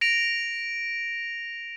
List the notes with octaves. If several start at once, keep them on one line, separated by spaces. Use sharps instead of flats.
A#6 D7 F7